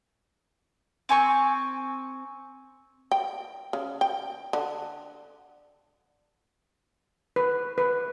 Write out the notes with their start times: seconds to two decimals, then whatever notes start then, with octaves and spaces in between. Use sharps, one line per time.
1.09 C4 G#5 C#6
3.11 G5
3.73 C#3
4.01 G5
4.53 D3
7.36 B4
7.78 B4